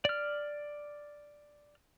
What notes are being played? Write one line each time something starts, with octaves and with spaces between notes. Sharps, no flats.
D5 F6